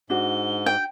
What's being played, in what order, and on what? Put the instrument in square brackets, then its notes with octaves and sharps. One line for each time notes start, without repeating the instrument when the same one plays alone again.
[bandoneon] G#2 [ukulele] D4 F#4 [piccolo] G7
[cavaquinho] G5